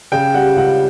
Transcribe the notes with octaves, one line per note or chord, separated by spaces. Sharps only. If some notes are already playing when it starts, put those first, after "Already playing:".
C#3 G5
G3 F#5
C#2 F#5